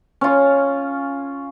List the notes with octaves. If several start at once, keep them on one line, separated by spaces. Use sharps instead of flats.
C#4 F4